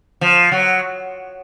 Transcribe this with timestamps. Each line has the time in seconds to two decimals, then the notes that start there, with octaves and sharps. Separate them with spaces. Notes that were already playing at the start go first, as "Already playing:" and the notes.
0.21 F3
0.52 F#3